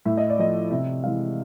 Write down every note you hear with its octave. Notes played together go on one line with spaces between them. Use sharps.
A2 E5
D#5
D5
F3 A3 D#5
C3 E5
E3 G#3 F5